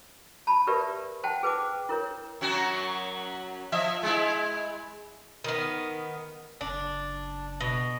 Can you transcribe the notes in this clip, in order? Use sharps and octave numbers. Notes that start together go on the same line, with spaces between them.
A5 B5
G4 A#4 B4 D5 E5
C5 F#5 G5 A5
G#4 B4 C5 G5 D6
E4 A#4 C#5
F#2 F#3 F#4
F3 D#5 E5
G#3 E4
D#3 B3
F#1 D4
B2